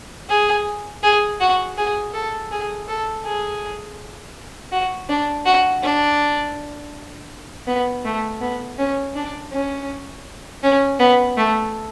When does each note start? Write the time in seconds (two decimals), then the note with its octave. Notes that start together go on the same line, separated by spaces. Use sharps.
0.29 G#4
1.03 G#4
1.40 F#4
1.77 G#4
2.13 A4
2.51 G#4
2.88 A4
3.24 G#4
4.72 F#4
5.09 D4
5.46 F#4
5.83 D4
7.67 B3
8.05 A3
8.41 B3
8.78 C#4
9.16 D4
9.52 C#4
10.63 C#4
10.99 B3
11.37 A3